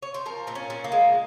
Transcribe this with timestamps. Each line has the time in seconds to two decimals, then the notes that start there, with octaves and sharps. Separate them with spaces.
0.03 C#5
0.14 C5
0.26 F3 A#4
0.47 A#2 C4
0.55 C#4
0.70 A#2
0.84 A#3
0.92 G#3